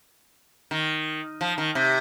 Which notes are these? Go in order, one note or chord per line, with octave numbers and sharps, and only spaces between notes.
D#3
F3
D#3
C3